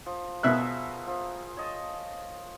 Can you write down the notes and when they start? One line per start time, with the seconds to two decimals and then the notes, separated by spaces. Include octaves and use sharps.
0.06 F3
0.43 B2 G#4 A#4 E5 F#6
1.07 F3
1.57 C#5 D#5 A5